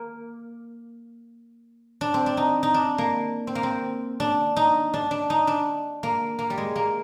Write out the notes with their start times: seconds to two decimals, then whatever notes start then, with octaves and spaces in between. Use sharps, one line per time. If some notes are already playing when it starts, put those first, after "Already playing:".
Already playing: A#3
2.01 D4
2.14 C4
2.26 D4
2.37 D#4
2.63 D#4
2.74 D4
2.98 A#3
3.47 C4
3.55 A#3
3.63 C4
4.20 D4
4.56 D#4
4.94 D4
5.11 D4
5.30 D#4
5.47 D4
6.03 A#3
6.39 A#3
6.50 G3
6.58 G#3
6.76 A#3